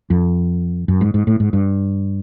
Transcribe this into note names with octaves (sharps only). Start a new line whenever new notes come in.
F2
F#2
G#2
G#2
A2
G#2
G2